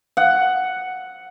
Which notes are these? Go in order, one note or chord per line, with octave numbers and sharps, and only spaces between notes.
F#5